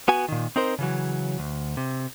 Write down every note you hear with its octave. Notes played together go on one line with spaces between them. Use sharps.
B3 F#4 G#5
A#2 D#3
C4 D#4 A#4 C5
C#3 E3 F#3
D2
C3